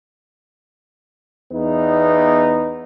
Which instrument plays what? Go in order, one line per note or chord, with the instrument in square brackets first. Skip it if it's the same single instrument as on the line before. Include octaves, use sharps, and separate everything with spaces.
[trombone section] E2 B3 D#4